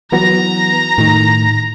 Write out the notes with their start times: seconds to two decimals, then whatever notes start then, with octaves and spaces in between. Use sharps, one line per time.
0.12 E3 F#3 B3 A#5 A#6
0.98 A2 D#3